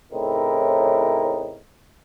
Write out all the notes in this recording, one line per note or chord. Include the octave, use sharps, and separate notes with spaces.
A2 C#3 C4 D#4 E4 A#4